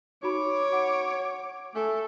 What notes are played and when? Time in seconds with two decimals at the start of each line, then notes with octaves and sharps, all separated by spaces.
0.23 D#4 F#4 C#5 B5 D6
0.73 F#5
1.75 A3 A4 G#5